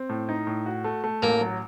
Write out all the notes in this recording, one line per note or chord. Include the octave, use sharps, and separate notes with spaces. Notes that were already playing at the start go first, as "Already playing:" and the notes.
Already playing: C4
A2
D#4
A2
F#4
A3
A3
A1 A#3
F#3